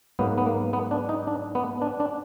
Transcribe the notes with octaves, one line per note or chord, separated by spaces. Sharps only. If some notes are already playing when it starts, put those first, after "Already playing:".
G#2 F#3 A#3 B3
B3
A#3
B3
D4
D#4
D4
B3
D4
D4